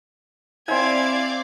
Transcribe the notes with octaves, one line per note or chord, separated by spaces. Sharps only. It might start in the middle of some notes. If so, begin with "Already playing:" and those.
C4 E4 D5 F5 G#5 D6 G#6